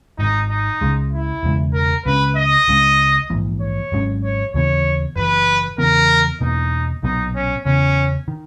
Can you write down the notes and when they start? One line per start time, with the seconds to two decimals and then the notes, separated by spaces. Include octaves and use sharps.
0.18 G#1 G#2 D#3 D#4
0.50 D#4
0.81 C#2 C#3 G#3
1.12 E4
1.43 E1 E2 C#3 G#3
1.74 A#4
2.05 C#2 C#3 G#3 C#4 B4
2.37 D#5
2.68 C#2 C#3 G#3
3.30 A#1 G#2 E3 A#3
3.60 C#5
3.92 G#1 G#2 F#3 C#4
4.23 C#5
4.54 D#2 C#3 E3 B3 C#5
5.16 F#1 F#2 E3 B4
5.78 E2 C#3 E3 B3 A#4
6.41 E2 B2 A#3 D#4
7.03 B1 A#2 F#3 B3 D#4
7.35 C#4
7.65 E2 C#3 E3 B3 C#4
8.28 D#3